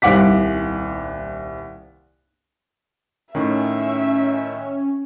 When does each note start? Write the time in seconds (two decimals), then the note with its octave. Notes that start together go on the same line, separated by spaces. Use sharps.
0.02 D#1 C2 F5 F#5 D6 B6
3.35 A2 D#3 C#4 E5